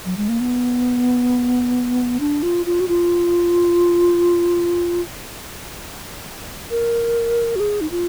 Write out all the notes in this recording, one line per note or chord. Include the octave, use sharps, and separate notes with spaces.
F#3
G#3
A#3
B3
D4
F4
F4
F#4
F4
A#4
F#4
G#4
D#4
F4